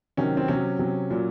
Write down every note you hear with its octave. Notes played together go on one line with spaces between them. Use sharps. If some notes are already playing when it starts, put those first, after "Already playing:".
C3 D#3 F#3 C#4
C4
C3 F#3 C#4
C3 F#3
A#2 F#3